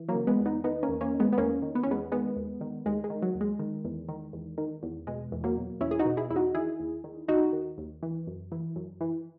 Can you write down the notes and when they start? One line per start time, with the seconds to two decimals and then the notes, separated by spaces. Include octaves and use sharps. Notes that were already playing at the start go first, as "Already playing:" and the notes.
Already playing: E3
0.09 F#3 A#3
0.15 C#3
0.27 G#3 B3
0.40 E2
0.46 B3 D#4
0.64 D#3 B3 D#4
0.83 A#3 C#4
0.89 E2
1.01 A#3 C#4
1.14 D#3
1.20 G#3 B3
1.33 B3
1.38 E2 A#3 C#4
1.62 D#3
1.75 B3
1.83 C#4
1.87 E2 G#3 B3
2.12 D#3 G#3 B3
2.36 D#2
2.61 D#3
2.86 D#2 G#3
3.04 G#3
3.10 D#3
3.22 F#3
3.35 D#2
3.41 G#3
3.59 D#3
3.84 E2
4.09 D#3
4.33 E2
4.58 D#3
4.83 E2
5.07 B2 G#3
5.32 E2
5.44 F#3 A#3
5.57 B2
5.81 E2 C#4 E4
5.91 G#4
5.99 D#4 F#4
6.05 B2
6.17 E4 G#4
6.30 E2 E4
6.36 D#4 F#4
6.54 D#3 E4 G#4
6.80 D#2
7.04 D#3
7.28 D#2 D#4 F#4
7.53 D#3
7.78 D#2
8.03 E3
8.27 F#2
8.52 E3
8.76 F#2
9.01 E3